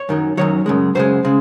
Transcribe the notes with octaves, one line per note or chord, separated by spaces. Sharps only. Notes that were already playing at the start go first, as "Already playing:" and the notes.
Already playing: C#5
F#2 D#3 F#3
F#2 D#3 F#3 C#5
F#2 C#3 G#3
F#2 C#3 G#3 C5
C#3 G#3